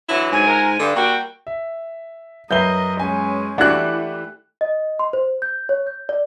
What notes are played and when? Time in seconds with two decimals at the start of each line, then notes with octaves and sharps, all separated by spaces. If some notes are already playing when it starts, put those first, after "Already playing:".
0.09 D3 E3 F#3 E4
0.32 G#2 G#5
0.47 G#3 F4 A#4
0.79 G2 D3
0.96 G3 A#3 F#4 G5
1.47 E5
2.51 F#2 A#4 B4 D#5 E5 G6 C7 G7
3.00 G#3 C#4 G#5
3.58 E3 A3 D4 E4 F#4 G4 F#5 F#6
4.61 D#5
4.99 C6
5.13 C5
5.42 G6
5.69 C#5
5.87 G6
6.09 D5